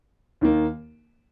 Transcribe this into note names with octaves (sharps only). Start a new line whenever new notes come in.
D#2 D#3 A#3